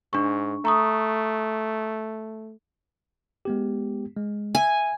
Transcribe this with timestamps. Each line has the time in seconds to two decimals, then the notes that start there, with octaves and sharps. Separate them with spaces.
0.13 G#2 D4 C#6
0.65 A3 A#5 C#6 D#6
3.45 G#3 B3 G4
4.16 G#3
4.55 E5 G#5